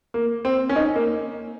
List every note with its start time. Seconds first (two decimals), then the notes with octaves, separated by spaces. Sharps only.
0.14 A#3
0.45 C4
0.69 C#4
0.76 D#4
0.96 A#3